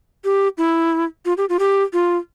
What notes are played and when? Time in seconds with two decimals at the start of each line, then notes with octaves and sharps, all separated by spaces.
0.24 G4
0.58 E4
1.25 F4
1.37 G4
1.49 F4
1.59 G4
1.93 F4